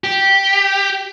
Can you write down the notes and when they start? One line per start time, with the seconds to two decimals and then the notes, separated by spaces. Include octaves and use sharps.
0.04 G4